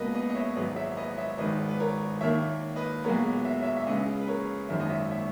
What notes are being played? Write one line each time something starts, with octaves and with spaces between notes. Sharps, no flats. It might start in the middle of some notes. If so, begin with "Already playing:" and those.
Already playing: C#2 B2 A#3 B4 D#5
B4 D#5
D#5
C#5 E5
G#1 G#2 F#3 B4 D#5
C#5 E5
B4 D#5
C#5 E5
G#1 G#2 D#3 B4 D#5
B4
A#4 C#5
D#2 D#3 A#3 C#5 E5
B4 D#5
B1 A#2 G#3 B3 A#4 C#5
E5
C#5 E5
E5
C#2 C#3 G#3 B4 D#5
B4
A#4 C#5
G#1 F#2 D#3 E5
D#5
C#5 E5
C#5 E5